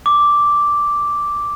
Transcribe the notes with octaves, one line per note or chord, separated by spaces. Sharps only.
D6